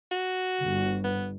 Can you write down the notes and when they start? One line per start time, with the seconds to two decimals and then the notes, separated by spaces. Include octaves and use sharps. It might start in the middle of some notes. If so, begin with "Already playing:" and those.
0.11 F#4
0.62 G1
1.04 B3